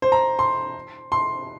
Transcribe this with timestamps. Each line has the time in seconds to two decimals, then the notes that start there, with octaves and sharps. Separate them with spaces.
0.02 C5
0.12 A#5
0.39 C6
1.12 C6